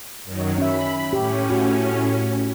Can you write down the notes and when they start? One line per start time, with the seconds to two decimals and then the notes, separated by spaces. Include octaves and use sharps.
0.24 F#2 D#3 F#3
0.58 C#4 E5 B5
1.13 A2 C#4 G4
1.50 F#4